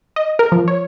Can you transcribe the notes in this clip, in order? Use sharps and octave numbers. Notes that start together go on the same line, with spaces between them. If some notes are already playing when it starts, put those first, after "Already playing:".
D#5
A#4
F3
C#5